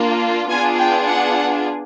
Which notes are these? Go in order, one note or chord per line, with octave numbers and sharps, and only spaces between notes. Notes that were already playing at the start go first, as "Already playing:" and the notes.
Already playing: A#3 D4 F4
B3 D4 F4 G#4 G#5
G5
F#5